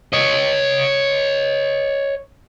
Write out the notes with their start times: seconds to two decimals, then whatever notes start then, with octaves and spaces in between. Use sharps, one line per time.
0.13 C#5 D#5